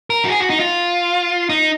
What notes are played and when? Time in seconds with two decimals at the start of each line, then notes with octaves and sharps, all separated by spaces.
0.10 A#4
0.25 F#4
0.29 G#4
0.40 F#4
0.50 D#4
0.60 F4
1.49 D#4